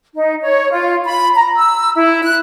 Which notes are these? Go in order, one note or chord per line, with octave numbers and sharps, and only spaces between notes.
D#4
C#5
F4
B5
A#5
E6
E4
F#6